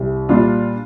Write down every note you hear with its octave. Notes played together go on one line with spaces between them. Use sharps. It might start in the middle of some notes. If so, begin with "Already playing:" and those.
Already playing: C2
A#2 G3 D4 F4